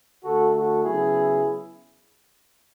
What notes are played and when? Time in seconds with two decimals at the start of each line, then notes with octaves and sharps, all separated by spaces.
0.24 D3 A3 F#4 A4
0.54 F#4 A4
0.84 C#3 F#3 B3 E4 G#4